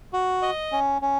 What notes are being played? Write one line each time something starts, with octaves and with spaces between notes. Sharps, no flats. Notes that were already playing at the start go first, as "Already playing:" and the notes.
F#4
D#5
C#4
C#4